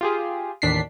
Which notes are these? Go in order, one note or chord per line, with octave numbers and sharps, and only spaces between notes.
F4 G4 G#4
A1 D#2 D4 B6 C7